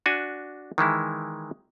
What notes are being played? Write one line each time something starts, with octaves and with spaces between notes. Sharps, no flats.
D4 F#4 G#5
D#3 E3 G#3 E4